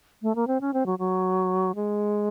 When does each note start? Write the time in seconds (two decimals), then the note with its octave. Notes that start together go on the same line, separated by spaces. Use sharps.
0.22 A3
0.36 A#3
0.47 C4
0.61 C#4
0.74 C4
0.86 F#3
0.99 F#3
1.75 G#3